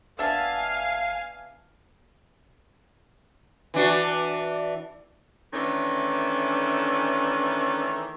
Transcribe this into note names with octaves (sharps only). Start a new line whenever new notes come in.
G1 B3 D4 E5 F5 G#5 A5
E3 D4 F#4
D#3 E3 A3 C#4 D4